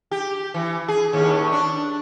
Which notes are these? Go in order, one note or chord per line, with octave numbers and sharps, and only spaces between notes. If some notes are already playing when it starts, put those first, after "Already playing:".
G4
E3
G#4
D#2 A2 C#4
D4